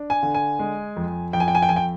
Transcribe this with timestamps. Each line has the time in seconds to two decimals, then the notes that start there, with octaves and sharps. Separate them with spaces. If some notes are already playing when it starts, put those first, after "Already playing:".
Already playing: D4
0.10 G#5
0.23 D3
0.34 G#5
0.59 G#3
0.97 F2
1.33 F2 G5
1.40 G#5
1.48 G5
1.55 G#5
1.62 G5
1.69 F2 G#5
1.76 G5